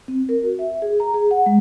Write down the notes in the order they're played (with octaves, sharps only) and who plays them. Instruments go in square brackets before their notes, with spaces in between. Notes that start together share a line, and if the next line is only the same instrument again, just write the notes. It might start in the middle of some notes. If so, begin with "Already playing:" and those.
[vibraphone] C4
A#4
F#4
E5
G#4
A#5
G#4
F#5
G#3